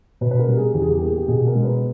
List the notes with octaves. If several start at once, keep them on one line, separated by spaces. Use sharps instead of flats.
B2 B4
B4
A#4
G3
G#4
E2 G4
G#4
G4
A#3 G#4
G4
B2 G#4
A#4
G#3
B4